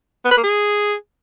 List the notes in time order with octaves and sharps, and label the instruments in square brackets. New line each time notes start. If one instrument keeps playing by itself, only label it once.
[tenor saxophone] B3
B4
A#3
G#4